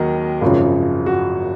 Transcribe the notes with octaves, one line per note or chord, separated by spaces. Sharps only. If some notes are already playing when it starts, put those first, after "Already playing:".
Already playing: D#2 D#3 F#3 F#4 A#4 D#5
G#1 F#2 C#3 F3 F4
F#4